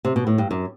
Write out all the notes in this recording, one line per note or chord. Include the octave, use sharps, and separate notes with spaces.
C3
B2
A2
G2
F#2